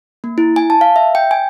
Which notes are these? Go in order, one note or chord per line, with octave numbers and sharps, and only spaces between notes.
A#3
E4
G#5
A5
F5
E5
G5
G#5